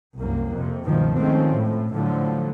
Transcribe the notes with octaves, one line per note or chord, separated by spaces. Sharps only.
C2 F#2 A#3
F2 C3
C#2 G2 B2 D#3 F3
D#3 F3 G#3 A3 C4 C#4
A2
A2 D3 F3 F#3